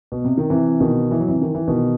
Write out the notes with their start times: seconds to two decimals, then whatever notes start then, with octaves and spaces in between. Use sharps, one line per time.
0.12 B2
0.25 C3
0.37 D#3
0.50 C3 E3
0.80 B2 D#3
1.11 E3
1.20 F#3
1.28 C3 E3
1.42 D#3
1.55 E3
1.68 B2 D#3